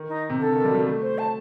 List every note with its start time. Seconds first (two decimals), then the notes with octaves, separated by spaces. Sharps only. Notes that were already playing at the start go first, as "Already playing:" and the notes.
Already playing: D#3
0.09 D#4
0.29 C3
0.40 D3 A4
0.52 D#3
0.64 G3
0.70 F#3
0.74 G3
0.87 A3
1.02 C5
1.18 A5